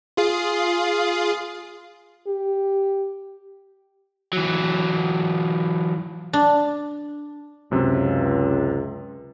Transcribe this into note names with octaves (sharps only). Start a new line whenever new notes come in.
F4 G#4 F5
G4
E3 F#3
D4
C#2 F#2 C3